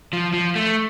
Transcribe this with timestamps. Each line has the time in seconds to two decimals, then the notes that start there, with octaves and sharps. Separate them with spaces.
0.13 F3
0.33 F3
0.56 A3